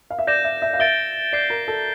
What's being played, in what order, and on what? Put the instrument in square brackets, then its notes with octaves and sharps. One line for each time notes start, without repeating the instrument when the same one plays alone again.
[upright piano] F5
E5
[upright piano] D5 [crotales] G6 A#6 E7
[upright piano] E5
E5
F5
[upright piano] E5 [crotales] A6 D7 G7
[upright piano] D5 [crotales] G6 C7 G7
[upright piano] A#4
A4